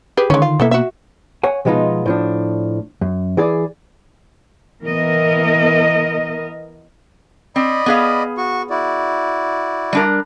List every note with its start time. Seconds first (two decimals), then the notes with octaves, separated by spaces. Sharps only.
0.17 G4 G#4 B4
0.30 D3 D#3 G#3 C#4
0.42 F4
0.60 B2 E3 A#3 B3 A4 E5
0.71 F#4 E5
1.43 C#5 F#5 G#5
1.65 B2 F3 G#3 B3 D#4 F4
2.06 A2 F3 D4
3.01 F#2
3.37 E3 G#4 D5
4.84 E3 B3 A#4 D#5
7.56 C4 D5 D#5 B5
7.86 B3 G#4 F5
8.37 F#4 C#6
8.70 E4 F#4 D5
9.93 G3 D4 A#4